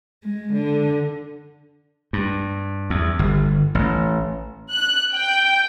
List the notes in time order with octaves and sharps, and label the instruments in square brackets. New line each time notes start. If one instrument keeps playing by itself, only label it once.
[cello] G#3
D3
[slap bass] G2
E2
G1
A1
[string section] F#6
G5